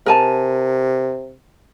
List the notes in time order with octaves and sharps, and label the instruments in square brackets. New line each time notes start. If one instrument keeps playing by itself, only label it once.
[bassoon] C3 [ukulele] A#4 G#5 A5